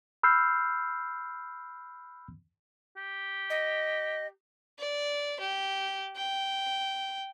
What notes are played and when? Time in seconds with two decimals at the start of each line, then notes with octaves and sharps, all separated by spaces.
0.23 B5 E6 F6 G6 C7
2.96 G4
3.50 D#5
4.79 D5
5.40 G4
6.16 G5